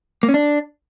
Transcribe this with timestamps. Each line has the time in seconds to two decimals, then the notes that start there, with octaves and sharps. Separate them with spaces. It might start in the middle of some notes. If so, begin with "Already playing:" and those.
0.23 A#3
0.29 C#4
0.34 D4